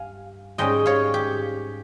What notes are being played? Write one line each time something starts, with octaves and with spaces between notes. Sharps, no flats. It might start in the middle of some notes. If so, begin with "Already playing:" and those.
Already playing: G2 F5 G#5
G#2 G3 C#4 D#5 G5
C#5 F5
G4